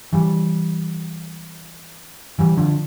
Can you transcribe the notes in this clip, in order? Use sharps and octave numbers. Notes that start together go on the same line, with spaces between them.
E3 G3
E3 G3
D3 F3